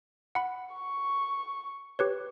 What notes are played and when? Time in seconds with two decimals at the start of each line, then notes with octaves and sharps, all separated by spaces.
0.35 F#5 B5
0.74 C#6
1.99 G4 B4 C#5